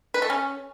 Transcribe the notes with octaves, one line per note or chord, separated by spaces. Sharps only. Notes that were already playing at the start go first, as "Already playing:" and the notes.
B4
A3
C#4